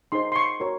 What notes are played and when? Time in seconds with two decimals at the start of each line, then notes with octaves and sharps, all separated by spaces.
0.12 D#4 G#4 C5 C6
0.32 C6
0.36 C#6
0.60 F#4 A#4 C#5